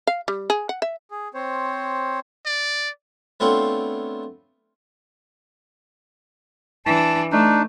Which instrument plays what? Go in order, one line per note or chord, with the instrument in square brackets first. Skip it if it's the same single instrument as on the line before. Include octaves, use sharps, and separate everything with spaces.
[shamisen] F5
G3
G#4
F#5
E5
[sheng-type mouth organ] G#4
C4 C5 C#5
[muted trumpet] D5
[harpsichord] A3 B3 C4 D4 F4 C#5
[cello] E3 D4 [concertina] A5
[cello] A3 [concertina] D4 D#4